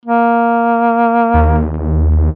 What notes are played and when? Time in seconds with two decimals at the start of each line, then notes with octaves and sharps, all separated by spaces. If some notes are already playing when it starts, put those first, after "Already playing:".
0.06 A#3
1.34 D#2